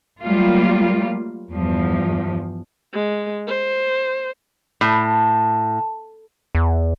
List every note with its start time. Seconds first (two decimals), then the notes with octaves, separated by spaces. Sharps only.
0.22 F#3 G3 A3 A#3 F4
1.51 E2 G2 F3
2.94 G#3
3.47 C5
4.81 A2
6.55 E2